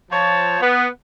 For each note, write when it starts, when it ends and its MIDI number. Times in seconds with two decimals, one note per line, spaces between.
0.11 0.60 53
0.11 0.60 73
0.11 0.60 81
0.60 0.87 59